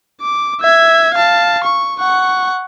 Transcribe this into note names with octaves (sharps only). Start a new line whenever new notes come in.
D6
E5 G#6
F5 A5
C#6
F#5 C#6